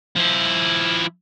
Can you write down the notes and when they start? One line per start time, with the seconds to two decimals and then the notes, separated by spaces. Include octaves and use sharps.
0.16 F3 E4